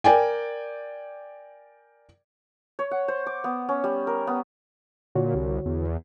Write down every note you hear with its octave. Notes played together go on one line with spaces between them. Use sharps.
A#4 D5 G5 G#5
C#5
F#5
C5
D6
B3
C#4
G3
A#4
B3
A#2 D3 F#4 C#5
C2
E2